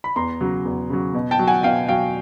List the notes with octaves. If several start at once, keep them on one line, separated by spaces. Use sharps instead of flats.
B5
E2 A#5 C6
C#3 F#3
E2
C#3 F#3
B2
G5 A5
F#3
F#5 G#5
B2 F5 G5
F#3 F5 G5